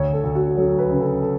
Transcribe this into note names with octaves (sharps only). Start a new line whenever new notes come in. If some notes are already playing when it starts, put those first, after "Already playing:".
Already playing: D2 C#5
A4
D2
F#4
F#3 A4
B4
C#3
A4
A4